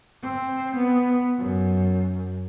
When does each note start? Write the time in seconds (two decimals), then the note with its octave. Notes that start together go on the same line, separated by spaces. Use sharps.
0.23 C4
0.76 B3
1.38 F#2